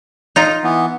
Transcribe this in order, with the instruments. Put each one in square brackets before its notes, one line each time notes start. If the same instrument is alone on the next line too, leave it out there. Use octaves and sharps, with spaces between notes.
[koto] D#4 F4 A#5
[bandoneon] E3 B3